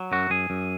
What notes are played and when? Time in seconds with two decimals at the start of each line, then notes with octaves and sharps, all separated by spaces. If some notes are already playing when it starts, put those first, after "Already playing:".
Already playing: F#3
0.12 F#2 F#4
0.30 F#2 G#4
0.50 F#2